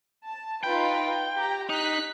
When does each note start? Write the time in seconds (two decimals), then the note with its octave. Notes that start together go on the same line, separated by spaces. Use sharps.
0.25 A5
0.63 D#4 F4 B4 G5
1.35 G4 A#5
1.69 D#4 F#6 B6